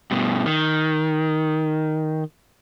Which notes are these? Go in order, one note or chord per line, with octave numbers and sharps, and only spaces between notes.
G2 B2
D#3